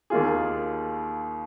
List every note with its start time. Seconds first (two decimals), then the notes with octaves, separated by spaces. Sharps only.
0.10 D#2 D#3 A#3 F4 G#4